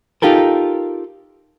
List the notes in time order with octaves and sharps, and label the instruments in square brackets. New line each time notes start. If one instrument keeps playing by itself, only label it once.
[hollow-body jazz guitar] D#4 F4 G4 A4 A#4